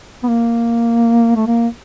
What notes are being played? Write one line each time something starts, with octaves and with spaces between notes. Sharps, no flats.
B3
A#3
A3
A#3